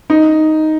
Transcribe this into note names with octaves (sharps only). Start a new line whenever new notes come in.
D#4